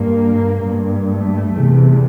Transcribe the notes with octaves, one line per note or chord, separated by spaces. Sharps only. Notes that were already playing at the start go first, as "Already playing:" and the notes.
Already playing: G2 A#3
G2
A3
E2 C3